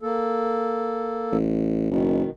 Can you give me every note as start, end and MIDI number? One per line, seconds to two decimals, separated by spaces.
0.02 1.37 58
0.02 1.37 69
1.32 1.88 33
1.91 2.24 30
1.91 2.30 47
1.91 2.30 51